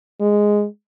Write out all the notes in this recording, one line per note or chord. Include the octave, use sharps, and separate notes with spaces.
G#3